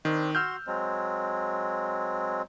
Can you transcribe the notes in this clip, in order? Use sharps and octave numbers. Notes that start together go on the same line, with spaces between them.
D#3 C4 D4 D#5
F#4 C6 E6 F6 G6
F#3 G#3 C4